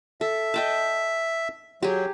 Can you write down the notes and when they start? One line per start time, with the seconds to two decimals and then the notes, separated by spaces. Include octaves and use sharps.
0.21 A4 E5
0.54 D#5 G5 A5
1.82 F#3 G4 G#4